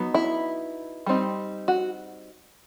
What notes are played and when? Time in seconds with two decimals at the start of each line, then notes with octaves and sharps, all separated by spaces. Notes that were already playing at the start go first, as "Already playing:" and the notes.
Already playing: F#3 B3 D#4
0.14 E4
1.06 G3 C4 D#4
1.68 F#4